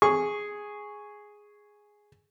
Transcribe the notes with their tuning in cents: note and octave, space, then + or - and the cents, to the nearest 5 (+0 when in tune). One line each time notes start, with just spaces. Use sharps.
G#4 +0 C#6 +0